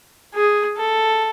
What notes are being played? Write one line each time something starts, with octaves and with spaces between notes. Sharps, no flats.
G#4
A4